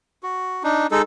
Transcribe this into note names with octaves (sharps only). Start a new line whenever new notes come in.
F#4
D4 D#4
G#3 D#4 A4